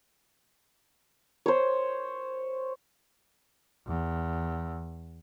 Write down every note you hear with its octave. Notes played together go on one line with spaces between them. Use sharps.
C5 C#5
E2